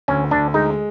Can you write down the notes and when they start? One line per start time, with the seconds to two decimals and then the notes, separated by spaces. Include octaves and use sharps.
0.08 D2 C#4
0.31 D2 D4
0.54 G#3 D#4